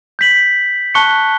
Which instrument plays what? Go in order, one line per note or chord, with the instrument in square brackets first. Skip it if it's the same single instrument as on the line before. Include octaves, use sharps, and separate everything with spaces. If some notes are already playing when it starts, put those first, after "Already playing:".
[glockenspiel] G6 B6 F#7
A5 C#6 F#6 C#7 G7